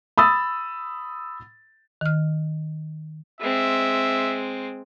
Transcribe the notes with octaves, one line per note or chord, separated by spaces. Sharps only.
B5 D#6 E6 A6
D#3 F6
G#3 C4 E5